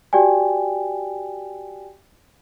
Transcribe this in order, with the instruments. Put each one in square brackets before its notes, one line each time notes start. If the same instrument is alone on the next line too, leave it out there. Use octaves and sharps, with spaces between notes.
[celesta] F#4 G4 D5 G5 G#5